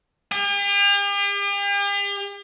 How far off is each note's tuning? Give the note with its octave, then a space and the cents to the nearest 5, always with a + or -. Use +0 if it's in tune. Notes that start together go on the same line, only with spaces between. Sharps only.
G4 +45